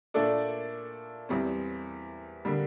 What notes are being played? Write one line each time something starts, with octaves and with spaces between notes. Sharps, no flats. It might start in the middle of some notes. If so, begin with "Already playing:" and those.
A#2 A3 D4 A4 D5
E2 E3 G3 C4
D3 G3 A#3 D4